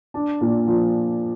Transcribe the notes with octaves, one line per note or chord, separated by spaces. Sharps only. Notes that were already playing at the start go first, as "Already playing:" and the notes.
D4
A#2
F3